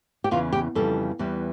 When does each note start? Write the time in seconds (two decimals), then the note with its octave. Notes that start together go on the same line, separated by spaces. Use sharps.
0.24 G4
0.31 E2 C#3 E3 F4
0.53 G4
0.75 F2 C#3 E3 G3 A4
1.19 E2 E3 G3